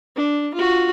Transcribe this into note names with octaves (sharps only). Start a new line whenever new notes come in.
D4
F4 F#4